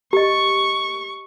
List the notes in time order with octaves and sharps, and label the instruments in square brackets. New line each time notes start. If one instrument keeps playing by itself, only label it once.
[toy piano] G4 D#5 [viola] C#6